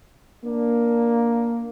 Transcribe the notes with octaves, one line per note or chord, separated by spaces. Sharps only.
A#3 D4